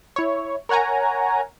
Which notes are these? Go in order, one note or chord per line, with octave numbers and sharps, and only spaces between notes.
E4 C#5
A#4 C#5 F#5 G#5 A#5